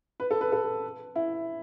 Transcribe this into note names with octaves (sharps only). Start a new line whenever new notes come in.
B4
A4
B4
A4
E4